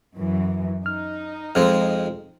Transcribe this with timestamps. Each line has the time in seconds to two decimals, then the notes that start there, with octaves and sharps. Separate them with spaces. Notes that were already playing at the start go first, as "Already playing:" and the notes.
0.16 F#2 E3
0.86 D#4 F6
1.55 F2 F3 G#3 C4 F6